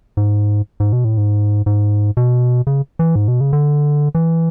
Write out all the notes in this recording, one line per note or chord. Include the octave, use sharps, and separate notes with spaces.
G#2
G#2
B2
A2
G#2
G#2
B2
C#3
E3
G#2
B2
C#3
D3
E3